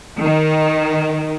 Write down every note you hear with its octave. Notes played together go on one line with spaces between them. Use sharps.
D#3